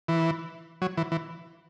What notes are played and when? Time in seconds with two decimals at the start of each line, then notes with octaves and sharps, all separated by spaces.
0.08 E3
0.82 F#3
0.97 E3
1.12 E3